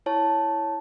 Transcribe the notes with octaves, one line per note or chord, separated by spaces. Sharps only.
E4 C#5 A5